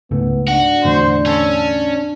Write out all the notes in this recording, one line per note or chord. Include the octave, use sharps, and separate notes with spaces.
C#2 G#2 A3 B3
D4 F#4
E2 A2 D3 C5
C#4 A4
A5